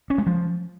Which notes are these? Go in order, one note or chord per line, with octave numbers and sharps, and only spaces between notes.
C#4
G#3
F3